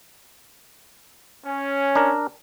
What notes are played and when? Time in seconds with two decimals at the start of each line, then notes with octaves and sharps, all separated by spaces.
1.45 C#4
1.95 D4 A#4